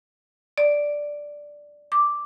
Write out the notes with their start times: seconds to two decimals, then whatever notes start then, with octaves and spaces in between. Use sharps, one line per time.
0.58 D5
1.92 D6